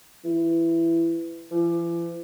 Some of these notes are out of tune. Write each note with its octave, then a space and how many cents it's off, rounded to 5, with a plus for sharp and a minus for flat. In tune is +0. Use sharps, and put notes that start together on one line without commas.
E3 +15
E3 +45